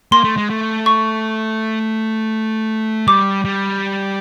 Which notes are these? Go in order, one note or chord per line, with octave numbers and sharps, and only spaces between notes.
A#3 C6
A3
G#3
A3
C#6
G3 D6
G3